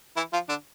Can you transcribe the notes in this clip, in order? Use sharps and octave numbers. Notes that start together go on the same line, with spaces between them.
E3 E4
F3 F4
D3 D4